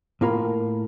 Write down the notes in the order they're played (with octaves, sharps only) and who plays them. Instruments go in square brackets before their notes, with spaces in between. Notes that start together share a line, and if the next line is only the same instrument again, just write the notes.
[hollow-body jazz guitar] A2 A#3 F4 A#4 B5